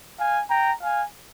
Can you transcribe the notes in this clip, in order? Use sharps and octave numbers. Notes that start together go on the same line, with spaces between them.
F5 G#5
G5 A#5
F5 G#5